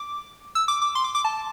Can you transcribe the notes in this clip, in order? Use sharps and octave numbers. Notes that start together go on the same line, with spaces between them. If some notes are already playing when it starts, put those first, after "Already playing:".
Already playing: D6
E6
D6
D6
C6
D6
D6
A5